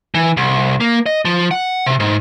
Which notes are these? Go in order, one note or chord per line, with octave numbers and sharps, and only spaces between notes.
E3
C2
A#3
D#5
F3
F#5
C3
G#2